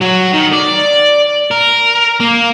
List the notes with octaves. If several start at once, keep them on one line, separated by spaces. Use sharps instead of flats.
F#3 F#4
D#3
D5
A#4
A#3